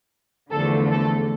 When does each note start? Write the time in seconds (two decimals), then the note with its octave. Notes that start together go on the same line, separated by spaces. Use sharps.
0.51 E2 D3 F3 A3 A4
0.91 A4